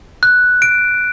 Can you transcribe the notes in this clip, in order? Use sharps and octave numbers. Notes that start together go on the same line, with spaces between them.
F#6
D7